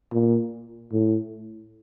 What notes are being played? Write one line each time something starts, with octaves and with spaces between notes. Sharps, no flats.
A#2
A2